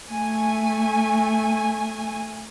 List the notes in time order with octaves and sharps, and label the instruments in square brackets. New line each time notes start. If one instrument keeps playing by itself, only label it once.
[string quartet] A3 [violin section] G#5